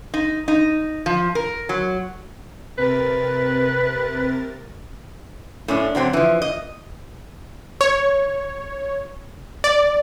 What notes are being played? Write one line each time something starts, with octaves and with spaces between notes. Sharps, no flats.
D#4
D#4
F3
A#4
F#3
C3 A#4 B4 A6
A2 C#4 D4
D3 F#3 C4 D4
E3 F3
D#5
C#5
D5